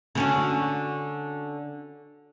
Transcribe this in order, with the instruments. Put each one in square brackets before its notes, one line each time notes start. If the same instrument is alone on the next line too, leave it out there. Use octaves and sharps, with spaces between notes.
[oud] D3 C#4 F#4